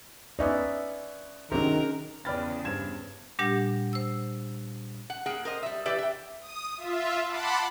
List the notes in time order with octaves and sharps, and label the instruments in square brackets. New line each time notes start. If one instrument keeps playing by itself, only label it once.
[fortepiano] B3 C#4 D#4 [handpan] D5 E5
[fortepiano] C3 F#3 [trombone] D#3 [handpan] C#4 D4 G#4 [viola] A#4
[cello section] E2 C#3 [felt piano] B4 G5 F6 [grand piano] D5 B5 A6
[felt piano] G2 C5 [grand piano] G#6 E7
[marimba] A#2 G3 D4 G4 F#5 A#6
C5 E6
[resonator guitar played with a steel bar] F#5
A#3 G#4 F#5 G5
A#4 C5 D#5
G3 E5
E3 G4 B4 D5 E5
E5 G5
[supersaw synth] D#6
F4 E5
F#5 A5 B5 C6 D6